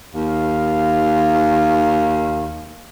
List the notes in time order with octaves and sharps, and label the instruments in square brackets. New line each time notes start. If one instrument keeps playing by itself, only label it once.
[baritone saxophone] D#2 [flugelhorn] F5